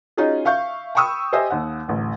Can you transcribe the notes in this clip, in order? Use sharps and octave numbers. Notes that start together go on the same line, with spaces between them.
C#4 D#4 F4 F#4 G#4
E5 F5 C#6 G6
G5 B5 C#6 D#6 E6
G4 C5 D#5 E5 G#5 D#6
D#2 F#5
A1 D2